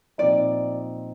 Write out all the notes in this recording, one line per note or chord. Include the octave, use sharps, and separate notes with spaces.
A#2 F3 C4 D#4 D5